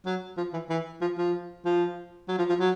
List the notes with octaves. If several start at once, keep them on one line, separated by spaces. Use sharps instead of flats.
F#3
F3
E3
E3
F3
F3
F3
F#3
F3
F3
F#3